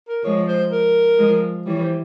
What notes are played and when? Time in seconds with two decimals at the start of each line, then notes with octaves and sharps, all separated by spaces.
0.08 A#4
0.24 F3 G#3 C#5
0.48 C5
0.72 A#4
1.19 F3 G#3
1.66 E3 G3 C#5
1.82 C5